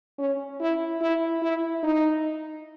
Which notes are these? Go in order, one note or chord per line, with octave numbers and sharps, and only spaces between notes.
C#4
E4
E4
E4
D#4